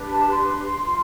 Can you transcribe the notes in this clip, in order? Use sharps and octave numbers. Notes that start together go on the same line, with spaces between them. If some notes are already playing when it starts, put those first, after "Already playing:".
Already playing: D4 G4 B4
A5
C6
F4